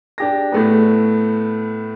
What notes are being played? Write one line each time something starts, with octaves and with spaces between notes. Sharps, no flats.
D4 G4 A#6
A2 A3 B3